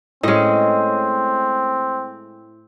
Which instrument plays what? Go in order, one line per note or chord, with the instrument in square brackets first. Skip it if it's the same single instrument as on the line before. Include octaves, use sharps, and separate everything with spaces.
[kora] A2 G#3 [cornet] C4 [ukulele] C#4 D#5